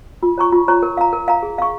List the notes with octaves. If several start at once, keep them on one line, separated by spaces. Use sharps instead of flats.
F4
C#5 A#5 C#6
F4
C#5 A#5 C#6
A#4
F5 A#5
A#4
F5 A#5
G#4
F5 C#6